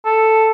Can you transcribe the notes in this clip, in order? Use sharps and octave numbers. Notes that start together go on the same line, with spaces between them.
A4